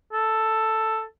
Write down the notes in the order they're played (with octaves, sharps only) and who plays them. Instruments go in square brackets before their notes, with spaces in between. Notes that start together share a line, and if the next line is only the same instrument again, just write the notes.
[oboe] A4